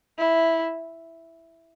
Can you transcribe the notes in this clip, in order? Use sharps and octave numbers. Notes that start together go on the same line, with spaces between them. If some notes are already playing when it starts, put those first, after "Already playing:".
E4